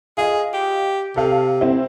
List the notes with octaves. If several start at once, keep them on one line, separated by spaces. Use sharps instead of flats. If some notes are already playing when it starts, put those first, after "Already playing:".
F4 G#4 D#5
G4
C3 A4 F5
C4 E4